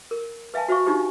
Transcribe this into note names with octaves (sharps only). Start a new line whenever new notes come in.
A#4
B4 E5 F5 G#5 A5
F#4 C5 E5 F5 C#6
D4 D#4 F4 G4 C5